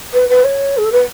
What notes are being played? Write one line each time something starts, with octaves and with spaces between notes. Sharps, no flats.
B4
B4
C#5
G#4
A4
B4